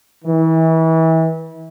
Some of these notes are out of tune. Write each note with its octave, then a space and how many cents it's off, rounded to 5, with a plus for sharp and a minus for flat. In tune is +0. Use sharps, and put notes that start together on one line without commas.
E3 -30